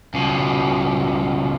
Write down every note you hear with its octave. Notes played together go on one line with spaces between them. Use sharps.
C#2 B2